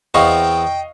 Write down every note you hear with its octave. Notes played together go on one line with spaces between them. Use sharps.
E2 B3 C4 D#5 F5 G5 C#6